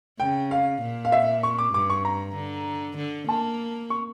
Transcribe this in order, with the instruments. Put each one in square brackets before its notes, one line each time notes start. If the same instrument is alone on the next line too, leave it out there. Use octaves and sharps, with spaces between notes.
[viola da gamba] C#3 [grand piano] G5
[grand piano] F5
[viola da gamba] A#2
[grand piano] F5
E5
C#6
D6
[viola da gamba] G2 [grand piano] D6
[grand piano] C#6
A#5
[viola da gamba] D3
D3
[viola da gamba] A#3 [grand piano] A5
[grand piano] C#6